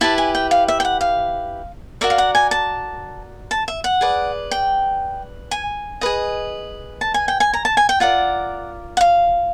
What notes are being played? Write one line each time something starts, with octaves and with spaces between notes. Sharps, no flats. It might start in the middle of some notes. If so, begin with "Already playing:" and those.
E4 G4 B4 A5
G#5
G5
F5
E5
G5
F#5
F5
F#4 A#4 D5 E5
F5
F#5
G#5
A5
A5
E5
F#5
G#4 B4 D5
G5
G#5
G#4 B4 D#5
A5
G#5
G5
G#5
A#5
A5
G#5
G5
F4 A#4 D5 F#5
F#5
F5